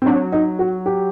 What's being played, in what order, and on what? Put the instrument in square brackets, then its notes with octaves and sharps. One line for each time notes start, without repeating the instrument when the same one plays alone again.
[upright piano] C4
[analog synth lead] F#3 [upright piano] D4
[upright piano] D#4
F#4
G4